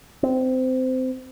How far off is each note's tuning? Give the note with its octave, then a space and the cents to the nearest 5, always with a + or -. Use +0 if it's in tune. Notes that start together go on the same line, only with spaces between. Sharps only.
C4 -20